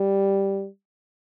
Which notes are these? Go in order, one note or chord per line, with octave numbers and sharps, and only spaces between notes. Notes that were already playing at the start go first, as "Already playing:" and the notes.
Already playing: G3